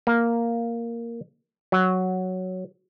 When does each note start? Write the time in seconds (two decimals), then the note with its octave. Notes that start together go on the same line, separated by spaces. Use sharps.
0.07 A#3
1.72 F#3